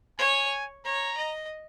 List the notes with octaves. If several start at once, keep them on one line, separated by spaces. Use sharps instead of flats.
C#5 G#5
C#5 A#5
D#5